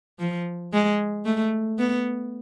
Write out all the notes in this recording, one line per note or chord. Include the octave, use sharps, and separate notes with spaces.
F3
G#3
A3
B3